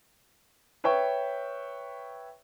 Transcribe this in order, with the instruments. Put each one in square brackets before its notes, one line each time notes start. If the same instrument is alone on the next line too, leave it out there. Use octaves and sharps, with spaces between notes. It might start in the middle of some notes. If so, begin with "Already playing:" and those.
[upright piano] B4 C#5 E5 G5 C#6